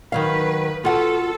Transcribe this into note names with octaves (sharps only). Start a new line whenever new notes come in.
D#3 F#3 B4 F5
F4 F#4 A4 F#5